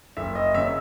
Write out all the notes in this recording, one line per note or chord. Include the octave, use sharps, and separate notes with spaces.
F#1 E5
D#5
F#2 C#3 E5